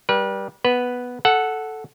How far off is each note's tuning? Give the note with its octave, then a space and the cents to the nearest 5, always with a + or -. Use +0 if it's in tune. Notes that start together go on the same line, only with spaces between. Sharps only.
G3 +0 B4 -35
B3 +0 B4 +0
A4 -5 F#5 +0